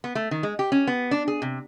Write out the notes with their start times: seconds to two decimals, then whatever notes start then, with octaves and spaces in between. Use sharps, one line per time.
0.04 B3
0.15 A3
0.31 D#3
0.43 G#3
0.59 G4
0.72 C#4
0.87 B3
1.11 D4
1.28 G#4
1.42 C3